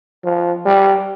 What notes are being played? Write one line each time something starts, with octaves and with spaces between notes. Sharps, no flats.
F3
G3